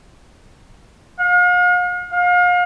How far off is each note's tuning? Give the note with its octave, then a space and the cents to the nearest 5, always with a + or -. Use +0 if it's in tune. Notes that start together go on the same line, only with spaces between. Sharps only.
F5 +45
F5 +35